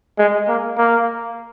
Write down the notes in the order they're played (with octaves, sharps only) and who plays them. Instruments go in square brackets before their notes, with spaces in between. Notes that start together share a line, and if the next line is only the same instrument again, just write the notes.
[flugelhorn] G#3
A#3
A#3